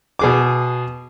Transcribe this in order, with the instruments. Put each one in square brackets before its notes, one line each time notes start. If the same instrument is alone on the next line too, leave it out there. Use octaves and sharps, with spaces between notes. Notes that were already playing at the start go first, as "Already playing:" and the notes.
[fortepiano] B2 G#4 D6